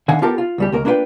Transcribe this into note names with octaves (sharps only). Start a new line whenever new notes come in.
D3 D#3 F5 F#5 G#5
B3 F4 G4 A4 A#4
F4
C#2 G3 G4
C#2 A#3 A#4
A#3 D4 E4 F4 B4 G5